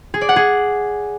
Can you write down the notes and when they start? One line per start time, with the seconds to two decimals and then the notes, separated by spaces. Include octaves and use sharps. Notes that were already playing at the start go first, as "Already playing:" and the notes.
0.14 G#4
0.21 D5
0.29 F#5
0.36 G#4